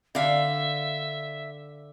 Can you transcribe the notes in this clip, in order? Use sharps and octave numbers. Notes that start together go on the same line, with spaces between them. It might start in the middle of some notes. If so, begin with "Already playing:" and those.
D3 E5 F5